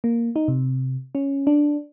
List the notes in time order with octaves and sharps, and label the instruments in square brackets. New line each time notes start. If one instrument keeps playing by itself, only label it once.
[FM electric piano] A#3
D#4
C3
C#4
D4